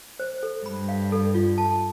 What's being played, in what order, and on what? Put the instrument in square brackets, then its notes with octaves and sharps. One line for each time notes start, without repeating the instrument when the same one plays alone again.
[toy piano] C5
A4
[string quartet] G2 [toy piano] B5
[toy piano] F5
A4
F4
A5